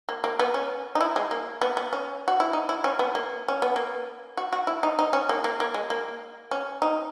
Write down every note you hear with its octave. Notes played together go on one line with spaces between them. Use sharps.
A#3
A#3
B3
C#4
D#4
E4
G#3
A#3
B3
B3
C#4
F#4
E4
D#4
E4
C#4
B3
A#3
C#4
B3
A#3
F#4
F#4
E4
D#4
D#4
C#4
A#3
A#3
A#3
G#3
A#3
C#4
D#4